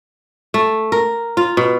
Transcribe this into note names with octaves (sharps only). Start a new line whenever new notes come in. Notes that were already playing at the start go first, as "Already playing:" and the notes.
A3
A#4
F4
B2